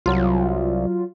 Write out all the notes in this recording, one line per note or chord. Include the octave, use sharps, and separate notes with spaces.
C2 F#3 F4